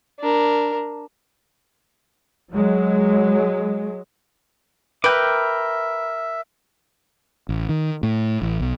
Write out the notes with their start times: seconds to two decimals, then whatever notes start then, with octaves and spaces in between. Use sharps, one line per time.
0.20 D4 A#4
2.52 F#3 G#3
5.04 A#4 B4 E5 G5 D6
7.49 A1
7.69 D#3
8.03 A2
8.42 A1
8.60 B1